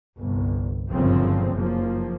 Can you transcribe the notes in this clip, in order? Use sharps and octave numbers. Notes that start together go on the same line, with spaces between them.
G1 C2
G1 F#2 A#2 C#3 F3 C4
F#1 F3 A#3